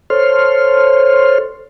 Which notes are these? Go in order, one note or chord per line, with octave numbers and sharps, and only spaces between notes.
A4 C5 C#5 C6 F6